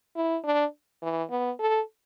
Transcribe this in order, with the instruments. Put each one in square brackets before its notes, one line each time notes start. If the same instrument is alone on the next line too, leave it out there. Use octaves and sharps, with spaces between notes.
[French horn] E4
D4
E3
B3
A4